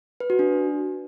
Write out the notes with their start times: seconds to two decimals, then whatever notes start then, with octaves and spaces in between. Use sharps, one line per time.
0.20 B4
0.30 F#4
0.39 D4